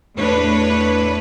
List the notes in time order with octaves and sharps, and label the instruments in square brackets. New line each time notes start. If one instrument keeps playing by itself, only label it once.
[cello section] E2 A2 D4 B4 C#5